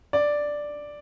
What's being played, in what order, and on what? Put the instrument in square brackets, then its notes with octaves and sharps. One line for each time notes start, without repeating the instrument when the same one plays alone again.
[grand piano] D5